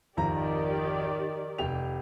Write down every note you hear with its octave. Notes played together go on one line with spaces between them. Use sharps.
G#1 F2 D#3 G4 D5 A#5
F1 G4 F7